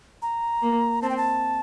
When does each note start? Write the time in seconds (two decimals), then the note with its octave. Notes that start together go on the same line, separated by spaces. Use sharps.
0.22 A#5
0.62 A#3
1.02 C4 A5
1.09 G5
1.17 A5